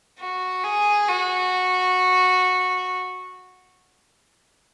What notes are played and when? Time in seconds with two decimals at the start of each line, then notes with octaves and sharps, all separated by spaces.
0.19 F#4
0.64 G#4
1.08 F#4